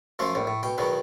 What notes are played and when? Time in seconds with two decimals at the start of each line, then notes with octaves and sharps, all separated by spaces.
0.19 F#2 F3 A3 F4
0.35 A#1 A2
0.47 A2
0.63 B2 G5
0.78 E2 B2 D#3 F#3